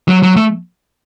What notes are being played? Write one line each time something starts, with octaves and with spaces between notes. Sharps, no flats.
F#3
F#3
A3